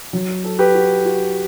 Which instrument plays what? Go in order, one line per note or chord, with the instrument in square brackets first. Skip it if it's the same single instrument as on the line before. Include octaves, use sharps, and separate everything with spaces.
[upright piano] F#3
A4
[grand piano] G4 B4
[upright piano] F#4
F#4